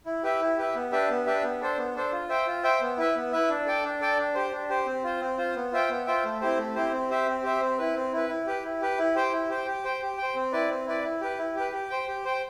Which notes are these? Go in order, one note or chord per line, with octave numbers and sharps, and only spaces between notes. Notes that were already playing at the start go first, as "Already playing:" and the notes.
E4
G4 B4 E5
E4
G4 B4 E5
B3
D4 G4 B4 E5
B3
D4 G4 B4 E5
B3
D4 A4 C5
B3
D4 A4 C5
F4
C5 E5 G5
F4
C5 E5 G5
B3
E4 B4 E5
B3
E4 B4 E5
D4
A4 D5 G5
D4
A4 D5 G5
D4
G4 C5
D4
G4 C5
C4
F4 C5
C4
F4 C5
B3
F4 C5 E5 G5
B3
F4 C5 E5 G5
A3
C4 E4 G4 C5
A3
C4 E4 G4 C5
C4
G4 C5 E5
C4
G4 C5 E5
C4
E4 B4
C4
E4 B4
E4
G4 B4
E4
G4 B4
E4
G4 C5 G5
E4
G4 C5 G5
G4
C5 G5
G4
C5 G5
C4
E4 B4 D5
C4
E4 B4 D5
E4
G4 B4
E4
G4 B4
G4
C5 G5
G4
C5 G5